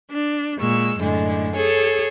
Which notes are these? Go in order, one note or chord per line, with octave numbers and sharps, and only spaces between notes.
D4
A#2 G#3 C#6 E6
F#2 A2 D3 G#3
G#4 A4 C#5